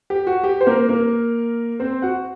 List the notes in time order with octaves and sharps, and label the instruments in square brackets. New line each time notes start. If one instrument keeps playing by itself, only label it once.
[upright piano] G4
F#4
G4
C5
A#3 A#4
A#3 A#4
C4 C5
F#4 F#5